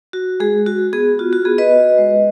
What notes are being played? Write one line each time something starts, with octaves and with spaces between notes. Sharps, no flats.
F#4
G#3 G#4
F#4
B3 G#4
F4 F#4
F#4
B3 G#4
B4 D#5
F#4
G#3